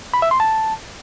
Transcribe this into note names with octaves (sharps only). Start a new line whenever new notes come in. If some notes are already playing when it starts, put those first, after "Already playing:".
B5
E5
C6
A5